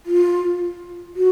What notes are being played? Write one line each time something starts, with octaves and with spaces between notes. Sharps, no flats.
F4
F#4